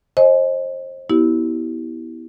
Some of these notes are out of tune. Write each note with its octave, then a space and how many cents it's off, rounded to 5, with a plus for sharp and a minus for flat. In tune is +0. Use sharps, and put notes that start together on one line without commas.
C5 +35 D#5 +0 G#5 +20
B3 +0 E4 -25 G4 -25